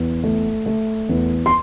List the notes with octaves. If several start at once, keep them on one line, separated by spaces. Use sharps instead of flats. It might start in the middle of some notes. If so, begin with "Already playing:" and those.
Already playing: E2
A3
A3
E2
C6